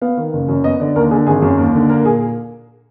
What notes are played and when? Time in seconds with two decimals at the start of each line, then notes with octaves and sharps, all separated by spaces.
0.01 B3 F5
0.17 D#3
0.33 F#1
0.48 F#2
0.64 B3 D#5
0.80 D3 D5
0.96 D#2 A#4
1.11 D3 G#4
1.27 G#1 G#4
1.42 F#2
1.58 D#2
1.74 D3
1.89 A#3 A#4
2.05 A#2 G#4